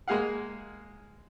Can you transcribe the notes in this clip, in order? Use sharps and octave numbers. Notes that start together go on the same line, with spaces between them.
G#3 A#3 G#4 F5 F#5